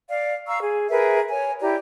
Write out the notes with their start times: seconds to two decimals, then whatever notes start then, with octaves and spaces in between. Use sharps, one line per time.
0.10 D5 F5
0.47 F5 A#5 C#6 E6
0.63 G#4
0.90 G#4 A#4 B4 E5
1.30 C#5 G#5
1.61 E4 G4 D5 A#5